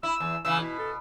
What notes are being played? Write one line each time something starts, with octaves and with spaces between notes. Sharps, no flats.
E4 E6
E2
C#3 E3 E6
B2 E4
A4